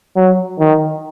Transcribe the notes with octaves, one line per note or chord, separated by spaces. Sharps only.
F#3
D#3